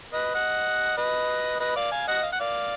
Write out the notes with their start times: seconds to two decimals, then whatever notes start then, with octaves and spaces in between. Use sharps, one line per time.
0.13 B4 D#5
0.34 D#5 F#5
0.97 B4 D#5
1.60 B4 D#5
1.75 D5 F5
1.91 F5 G#5
2.08 D#5 F#5
2.23 F5
2.32 F#5
2.40 D5 F5